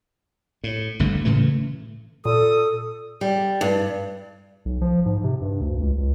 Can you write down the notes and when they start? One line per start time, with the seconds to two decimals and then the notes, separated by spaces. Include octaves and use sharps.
0.64 A2
0.99 G1 G2 D3 A3
1.25 A2 C#3 E3 A3
2.25 A#2 A4 D#6
3.21 G3
3.61 G2
4.65 B1
4.81 F3
5.06 G#2
5.24 C3
5.42 G2
5.61 D2
5.82 C#2
5.98 C#2